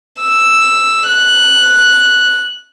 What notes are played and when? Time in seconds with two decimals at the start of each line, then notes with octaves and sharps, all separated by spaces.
0.21 E6
1.07 F#6